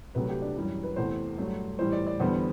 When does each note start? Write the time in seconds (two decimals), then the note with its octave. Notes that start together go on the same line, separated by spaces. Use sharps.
0.15 C2 C3 F#3 A3 B4
0.29 G4
0.42 D4
0.56 F#2 E3 G3
0.84 B4
0.96 E2 C3 E3 A3 C5
1.38 G2 F#3 A3
1.79 A2 E3 G3 C5
1.92 D5
2.07 D5
2.20 E2 D3 G3 B3 C5